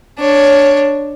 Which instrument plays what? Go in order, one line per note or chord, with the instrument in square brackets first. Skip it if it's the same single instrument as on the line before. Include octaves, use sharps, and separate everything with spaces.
[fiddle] D4 C#5